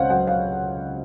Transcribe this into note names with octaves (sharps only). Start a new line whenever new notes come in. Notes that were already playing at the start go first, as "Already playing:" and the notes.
Already playing: C#2 C#3 C5 C#5 F5 F#5
F#3 F#5
F5